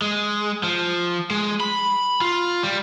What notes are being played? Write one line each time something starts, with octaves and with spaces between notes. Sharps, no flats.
G#3
F3
G#3
B5
F4
G3